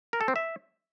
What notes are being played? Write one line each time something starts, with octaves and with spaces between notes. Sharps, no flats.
A#4
A4
C4
E5